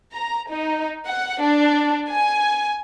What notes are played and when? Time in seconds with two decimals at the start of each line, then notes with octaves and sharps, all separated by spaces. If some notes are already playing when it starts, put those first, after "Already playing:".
0.13 A#5
0.48 D#4
1.04 F#5
1.39 D4
2.09 G#5